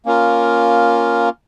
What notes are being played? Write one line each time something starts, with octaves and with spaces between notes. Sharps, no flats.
A#3 C#4 F4 A#4